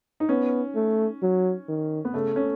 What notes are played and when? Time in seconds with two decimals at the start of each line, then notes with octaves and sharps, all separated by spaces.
0.20 D#4
0.29 B3 C#4
0.75 A3
1.22 F#3
1.68 D#3
2.05 B3
2.14 C#3 A3
2.36 C#4